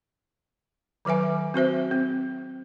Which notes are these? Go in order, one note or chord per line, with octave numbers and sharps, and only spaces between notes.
D#3 F#3 B4 E5 G#5
C4 F#4 C5 E5
C4